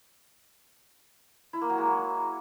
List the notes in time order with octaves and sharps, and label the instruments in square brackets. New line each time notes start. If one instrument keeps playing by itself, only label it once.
[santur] E4
A#3
F#3
G#3
F#3